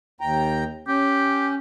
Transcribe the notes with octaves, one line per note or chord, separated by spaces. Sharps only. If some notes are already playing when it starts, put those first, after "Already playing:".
D#2 G5 A#5
C#4 G4